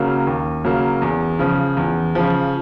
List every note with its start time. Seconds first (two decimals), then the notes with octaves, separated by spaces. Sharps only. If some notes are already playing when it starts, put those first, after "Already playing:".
Already playing: C#3 F#3 A#3
0.27 D#2
0.64 C#3 F#3 A#3
1.02 E2
1.39 C#3 F3
1.77 E2
2.15 C#3 F3